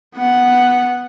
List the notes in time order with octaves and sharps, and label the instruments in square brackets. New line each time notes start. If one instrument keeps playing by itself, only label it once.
[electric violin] B3 F#5